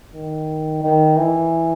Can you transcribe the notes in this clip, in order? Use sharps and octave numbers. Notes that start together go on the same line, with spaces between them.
D#3
D#3
E3